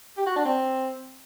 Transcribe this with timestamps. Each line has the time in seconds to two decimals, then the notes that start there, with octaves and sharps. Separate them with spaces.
0.17 G4
0.26 F#4
0.36 D4
0.45 C4